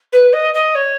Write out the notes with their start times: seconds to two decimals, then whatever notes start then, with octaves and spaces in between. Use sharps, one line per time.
0.12 B4
0.32 D#5
0.54 D#5
0.74 C#5